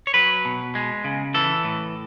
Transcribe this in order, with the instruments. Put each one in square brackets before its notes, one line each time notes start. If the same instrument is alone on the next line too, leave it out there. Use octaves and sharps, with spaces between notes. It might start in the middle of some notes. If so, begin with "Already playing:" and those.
[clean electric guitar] C#5
F#3 B4
B2
G#3
C#3
E3 A4
A2